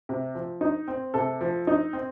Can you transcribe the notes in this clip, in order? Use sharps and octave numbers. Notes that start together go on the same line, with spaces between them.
C3
F3
D#4
C4
C3 A4
F3
D#4
C4